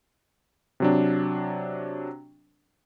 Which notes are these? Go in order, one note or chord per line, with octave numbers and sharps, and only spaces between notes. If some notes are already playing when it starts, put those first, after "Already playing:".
C3 F#3 D4